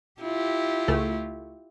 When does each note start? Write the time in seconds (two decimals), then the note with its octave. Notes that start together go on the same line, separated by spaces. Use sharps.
0.21 E4 F4 G4
0.88 C#2 A3